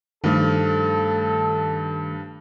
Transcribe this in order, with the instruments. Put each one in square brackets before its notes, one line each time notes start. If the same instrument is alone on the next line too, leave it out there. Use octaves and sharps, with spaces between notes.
[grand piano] G2 F3 [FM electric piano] D#3 A3 [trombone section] A4